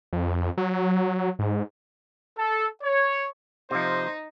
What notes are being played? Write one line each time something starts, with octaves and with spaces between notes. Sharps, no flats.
F2
F#3
G#2
A4
C#5
C3 F3 D#4 C5